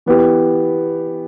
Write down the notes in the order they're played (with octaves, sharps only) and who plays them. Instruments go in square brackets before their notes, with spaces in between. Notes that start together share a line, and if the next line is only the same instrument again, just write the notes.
[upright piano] E3 B3 G4